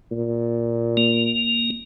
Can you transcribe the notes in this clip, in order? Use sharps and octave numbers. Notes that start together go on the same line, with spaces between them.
A#2
A#3